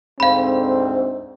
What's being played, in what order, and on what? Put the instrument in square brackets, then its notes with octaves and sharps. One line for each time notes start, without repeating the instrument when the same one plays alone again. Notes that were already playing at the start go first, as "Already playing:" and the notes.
[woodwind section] D2 G#2 [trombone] C4 [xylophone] F5 B5